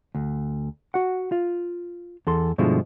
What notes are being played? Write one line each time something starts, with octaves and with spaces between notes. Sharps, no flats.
D2
F#4 F#5
F4
E2 A4 C6
G2 B2 D3 F3 G#3 E4